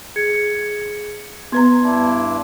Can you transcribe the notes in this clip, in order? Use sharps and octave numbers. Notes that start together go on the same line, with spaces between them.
G#4 G#6 C#7
B3 B4 A#5 C6 G#6
G2 D4 E4